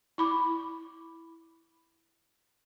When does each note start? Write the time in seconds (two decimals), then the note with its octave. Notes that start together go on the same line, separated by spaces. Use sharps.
0.18 E4 B5 D6